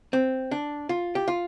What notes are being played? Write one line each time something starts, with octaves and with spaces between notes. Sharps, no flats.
C4
D4
F4
G4
F4